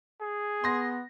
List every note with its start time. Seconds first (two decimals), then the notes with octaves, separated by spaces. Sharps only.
0.21 G#4
0.64 B3 C6 A#6